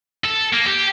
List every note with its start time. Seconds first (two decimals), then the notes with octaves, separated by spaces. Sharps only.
0.25 A4
0.53 A#3
0.66 G4